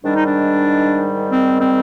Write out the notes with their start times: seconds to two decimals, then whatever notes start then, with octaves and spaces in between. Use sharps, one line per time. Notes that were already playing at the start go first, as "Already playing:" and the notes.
0.03 G#2 D#3 G3 D4
0.15 D#4
0.26 D4
1.29 C4
1.60 C4